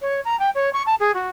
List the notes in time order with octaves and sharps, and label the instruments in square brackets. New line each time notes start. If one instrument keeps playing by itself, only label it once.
[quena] C#5
A#5
G5
C#5
C#6
A5
G#4
F#4